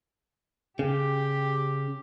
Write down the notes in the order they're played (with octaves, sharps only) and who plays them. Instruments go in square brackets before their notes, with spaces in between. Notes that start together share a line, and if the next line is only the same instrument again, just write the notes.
[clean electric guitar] C#3 [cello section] G4